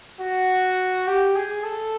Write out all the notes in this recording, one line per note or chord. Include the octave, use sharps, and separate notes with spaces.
F#4
G4
G#4
A4